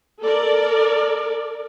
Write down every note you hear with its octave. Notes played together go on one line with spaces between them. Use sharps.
A4 A#4 D5